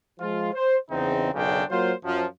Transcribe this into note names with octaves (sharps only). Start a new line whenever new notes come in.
F3 G#3 F4
C5
E2 C#3 C4 D#4
B1 F#2 C#3 D4 G5
F#3 A#3 F4 C5
F#2 F3